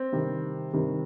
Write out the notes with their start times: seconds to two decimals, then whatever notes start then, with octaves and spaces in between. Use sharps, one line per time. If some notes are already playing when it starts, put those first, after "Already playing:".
Already playing: C4
0.12 C3 D#3 G3
0.73 C3 D#3 G3